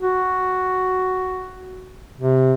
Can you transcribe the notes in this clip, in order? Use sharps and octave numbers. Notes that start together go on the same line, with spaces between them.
F#4
C3